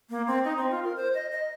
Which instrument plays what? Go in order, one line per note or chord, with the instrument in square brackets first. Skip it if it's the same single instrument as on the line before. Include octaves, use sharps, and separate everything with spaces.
[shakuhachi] A#3
C4
D#4
C4
F4
A#4
C5
D#5
D#5